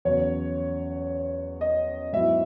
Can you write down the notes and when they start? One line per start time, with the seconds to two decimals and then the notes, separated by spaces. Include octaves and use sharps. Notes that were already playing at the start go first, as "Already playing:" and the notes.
0.05 E2 C#3 F#3 C#5
1.61 D#5
2.13 G#2 F#3 B3 E4 E5